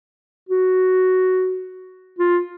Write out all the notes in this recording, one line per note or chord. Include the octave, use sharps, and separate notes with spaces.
F#4
F4